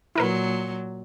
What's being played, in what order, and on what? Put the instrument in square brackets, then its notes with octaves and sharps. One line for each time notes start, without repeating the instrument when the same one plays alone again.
[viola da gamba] A#2 F#3 [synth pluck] E4 A#4 B4